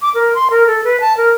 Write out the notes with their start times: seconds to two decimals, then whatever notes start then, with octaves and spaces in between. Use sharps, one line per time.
0.02 D6
0.14 A#4
0.35 C6
0.50 A#4
0.67 A4
0.84 B4
1.01 A5
1.17 A#4